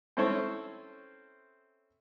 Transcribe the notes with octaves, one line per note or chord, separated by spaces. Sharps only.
C4 C#4 E4 A4 C5 C#5